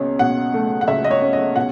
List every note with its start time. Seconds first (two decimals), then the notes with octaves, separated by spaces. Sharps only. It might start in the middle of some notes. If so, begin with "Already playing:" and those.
Already playing: C#2 B2 C#4
0.19 B2 F#5
0.54 A3
0.81 F#5
0.88 C#2 E5
1.04 D#5
1.11 C#5
1.22 C#4
1.33 D#5
1.56 B2 F#5